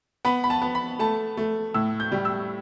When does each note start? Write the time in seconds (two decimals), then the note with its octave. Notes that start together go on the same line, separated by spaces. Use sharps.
0.25 B3 B5
0.44 B5
0.50 A5
0.62 B3
0.75 B5
0.99 A3 A5
1.37 A3
1.74 A2 E6
2.00 G6
2.12 G3
2.25 E6